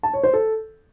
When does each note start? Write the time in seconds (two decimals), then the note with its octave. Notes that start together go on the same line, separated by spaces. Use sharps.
0.03 A5
0.13 C#5
0.23 C5
0.34 A4